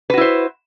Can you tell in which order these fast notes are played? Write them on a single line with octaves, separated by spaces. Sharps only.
B4 F#4 E4 C5